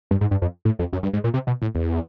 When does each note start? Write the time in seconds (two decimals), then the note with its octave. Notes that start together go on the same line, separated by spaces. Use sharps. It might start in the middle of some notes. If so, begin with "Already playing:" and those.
0.11 G2
0.21 G#2
0.31 G2
0.42 F2
0.65 A2
0.79 F2
0.93 F#2
1.03 G2
1.13 G#2
1.24 A#2
1.34 C3
1.47 B2
1.62 A2
1.75 E2